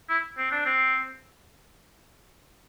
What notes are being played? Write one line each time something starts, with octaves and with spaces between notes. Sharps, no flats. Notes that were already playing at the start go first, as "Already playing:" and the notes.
E4
C4
D4
C4